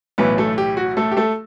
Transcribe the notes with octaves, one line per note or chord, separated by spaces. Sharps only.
B1 A2 E3 B3 B4
A3 A4
G4
F#4
A3 A4
G4
A3 A4